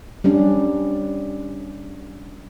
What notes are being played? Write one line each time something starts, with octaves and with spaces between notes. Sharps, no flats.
G3 C#4 D4